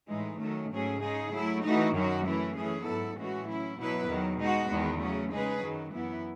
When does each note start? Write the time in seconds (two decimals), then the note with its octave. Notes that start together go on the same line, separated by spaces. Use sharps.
0.09 A2 E3 G#3 D#4
0.40 D#3 F#3 A3 C#4
0.71 G#2 F#3 A3 C#4 G#4
1.02 C#3 G#3 D#4 G#4
1.32 F#3 A3 E4
1.64 E3 A3 D#4 F#4
1.94 F#2 D#3 F#3 C#4 F#4
2.25 E3 A3 C#4 E4
2.55 E3 A3 C#4 G#4
2.86 G#2 F#3 B3 E4 A4
3.16 A2 E3 G#3 C#4 F#4
3.47 F#3 C#4 E4
3.78 B2 F#3 B3 E4 B4
4.08 E2 D#3 F#3
4.40 B2 G#3 D#4 F#4
4.70 E2 D#3 G#3 B3
5.00 C#3 F#3 A3 C#4
5.32 C#3 G#3 D#4 G#4 B4
5.62 F#2 D#3 F#3
5.93 F#2 E3 B3 E4